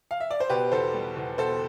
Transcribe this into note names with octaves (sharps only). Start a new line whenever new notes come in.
F5
E5
D5
C5
B2 G4 B4
E2 A4 C5
G3
E2
B2 A4 C5